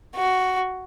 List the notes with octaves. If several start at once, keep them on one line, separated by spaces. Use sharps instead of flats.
F#4